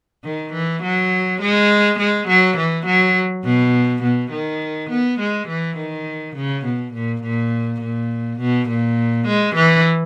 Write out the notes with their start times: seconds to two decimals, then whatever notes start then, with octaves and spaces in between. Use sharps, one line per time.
0.24 D#3
0.53 E3
0.83 F#3
1.41 G#3
1.99 G#3
2.28 F#3
2.57 E3
2.86 F#3
3.44 B2
4.03 B2
4.32 D#3
4.90 B3
5.19 G#3
5.48 E3
5.77 D#3
6.35 C#3
6.65 B2
6.94 A#2
7.23 A#2
7.81 A#2
8.39 B2
8.68 A#2
9.27 G#3
9.55 E3